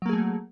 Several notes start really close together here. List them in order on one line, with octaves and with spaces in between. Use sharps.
F#3 A#3 G#4 A3